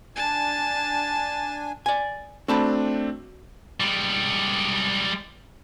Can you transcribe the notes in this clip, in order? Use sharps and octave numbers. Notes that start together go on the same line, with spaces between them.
D4 G#5 A5
D5 G#5
A3 C4 D4 F#4 A5 B5
G3 G#3